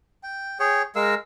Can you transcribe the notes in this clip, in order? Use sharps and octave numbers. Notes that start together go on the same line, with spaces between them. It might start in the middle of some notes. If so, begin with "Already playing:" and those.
G5
G#4 C#5 G5
G#3 A#4 F5 E6